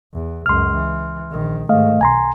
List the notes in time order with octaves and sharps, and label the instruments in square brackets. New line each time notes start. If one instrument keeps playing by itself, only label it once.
[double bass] E2
[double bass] C#2 F#2 [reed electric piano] C6 F6
[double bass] E3
A#1 D#3
[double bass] G#2 D#3 [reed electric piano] A3 D#5 F5
[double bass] B1 [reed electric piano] G#5 A#5 C6